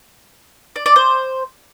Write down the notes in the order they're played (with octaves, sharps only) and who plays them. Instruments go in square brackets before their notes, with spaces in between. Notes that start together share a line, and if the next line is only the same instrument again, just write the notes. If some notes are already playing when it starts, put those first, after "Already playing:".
[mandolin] D5
D5
C5